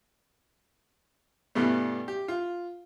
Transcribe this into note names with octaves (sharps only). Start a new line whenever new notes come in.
G2 B2 E3 G3 A3 B3
G4
F4